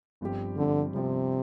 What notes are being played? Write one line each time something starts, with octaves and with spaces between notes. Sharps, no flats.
G1 G2 F3 C4 G4
G1 G2 D3 F3 C4 G4
G1 G2 C3 F3 C4 G4